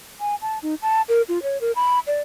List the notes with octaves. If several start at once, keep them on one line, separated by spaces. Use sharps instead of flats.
G#5
A5
D#4
A5
A#4
F4
C#5
A#4
B5
D5